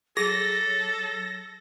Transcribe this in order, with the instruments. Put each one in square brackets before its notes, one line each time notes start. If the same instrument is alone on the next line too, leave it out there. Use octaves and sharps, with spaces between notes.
[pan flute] F#3 [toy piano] G#4 [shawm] A4 [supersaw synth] A#6